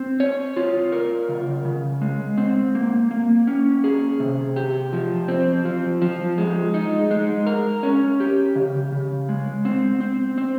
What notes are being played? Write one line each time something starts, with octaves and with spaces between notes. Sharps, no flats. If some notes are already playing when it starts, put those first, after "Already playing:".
Already playing: C4
C#5
F4
A#4
C#3
C#3
G#3
C4
A#3
A#3
C#4
G#4
C3
G4
F3
C4
F3
F3
G#3
D#4
G#3
A#4
C#4
G4
C#3
C#3
G#3
C4
C4
C4